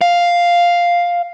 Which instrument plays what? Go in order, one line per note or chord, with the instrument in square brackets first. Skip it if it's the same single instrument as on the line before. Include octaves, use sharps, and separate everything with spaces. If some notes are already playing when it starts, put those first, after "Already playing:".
[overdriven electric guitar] F5